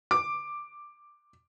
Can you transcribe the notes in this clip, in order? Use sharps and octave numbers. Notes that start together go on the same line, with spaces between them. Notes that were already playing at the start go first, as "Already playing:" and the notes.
D6